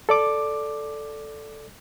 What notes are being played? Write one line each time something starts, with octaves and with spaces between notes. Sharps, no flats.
A4 D5 D6